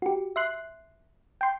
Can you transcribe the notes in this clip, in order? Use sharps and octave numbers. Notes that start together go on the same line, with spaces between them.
F#4 G4
E5 C6 F#6 C7
G5 C6